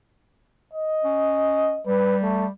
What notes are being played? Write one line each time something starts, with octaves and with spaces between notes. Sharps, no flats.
D#5
C#4
G3 B4
A3